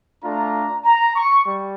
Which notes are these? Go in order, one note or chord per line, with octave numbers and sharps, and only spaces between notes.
A3 D4 F4 A#5
A#5
C#6
G3